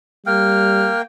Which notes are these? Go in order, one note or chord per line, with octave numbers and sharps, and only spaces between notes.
G3 A#3 G5 F6